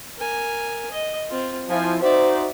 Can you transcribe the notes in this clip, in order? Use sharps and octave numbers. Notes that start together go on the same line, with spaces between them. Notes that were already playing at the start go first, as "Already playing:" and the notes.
A#4 G#5
D#5
C4 F4
F3 E4 G#5
D#4 F#4 C5 D5 E5